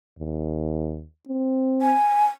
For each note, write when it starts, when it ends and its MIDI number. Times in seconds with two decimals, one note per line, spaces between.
0.19 1.05 39
1.28 1.94 60
1.82 2.24 80